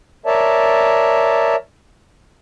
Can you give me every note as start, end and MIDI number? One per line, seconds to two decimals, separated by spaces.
0.26 1.56 70
0.26 1.56 73
0.26 1.56 74
0.26 1.56 76
0.26 1.56 81